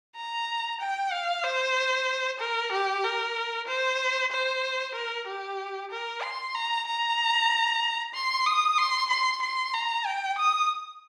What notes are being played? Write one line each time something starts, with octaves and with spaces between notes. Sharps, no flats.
A#5
G5
F5
C5
A#4
G4
A#4
C5
C5
A#4
G4
A#4
C6
A#5
A#5
C6
D#6
C6
C6
C6
A#5
G5
D#6